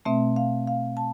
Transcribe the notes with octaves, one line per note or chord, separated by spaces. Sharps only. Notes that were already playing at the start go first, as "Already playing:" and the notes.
B2 A3 C4 E5
F5
F5
A5